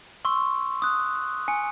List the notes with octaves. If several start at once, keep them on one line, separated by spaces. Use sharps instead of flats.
C6 C#6 E6
D#6 F#6
G#5 C#7